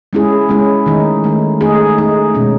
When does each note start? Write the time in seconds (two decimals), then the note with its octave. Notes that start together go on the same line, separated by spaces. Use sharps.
0.13 G#3 C#4 E4 G#4
0.49 G#3 C#4 E4 G#4
0.86 D#3 A3 D#4
1.24 D#3 A3 D#4
1.61 A3 D#4 G#4
1.98 A3 D#4 G#4
2.35 B2 G#3 C#4